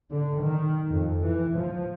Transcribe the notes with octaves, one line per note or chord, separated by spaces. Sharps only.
D3
D#3
F2
E3
F3